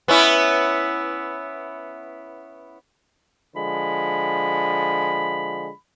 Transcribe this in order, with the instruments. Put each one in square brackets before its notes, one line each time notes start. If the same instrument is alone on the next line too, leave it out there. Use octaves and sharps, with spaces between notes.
[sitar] B3 C#4 E4
[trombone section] D3 F3 G#3 [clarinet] B5